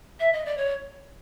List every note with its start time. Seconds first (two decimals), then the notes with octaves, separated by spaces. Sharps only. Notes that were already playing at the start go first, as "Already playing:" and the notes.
0.19 E5
0.32 D#5
0.45 D5
0.57 C#5